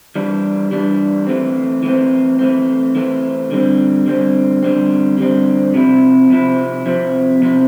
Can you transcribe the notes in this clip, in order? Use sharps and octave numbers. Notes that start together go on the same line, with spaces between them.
E3 G3 D4
E3 G3 D4
E3 A3 C4
E3 A3 C4
E3 A3 C4
E3 A3 C4
D3 G3 C4
D3 G3 C4
D3 G3 C4
D3 G3 C4
C3 F3 C4 E4
C3 F3 C4 E4
C3 F3 C4 E4
C3 F3 C4 E4